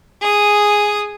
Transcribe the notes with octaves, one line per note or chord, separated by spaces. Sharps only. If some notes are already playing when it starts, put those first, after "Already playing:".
G#4 D#6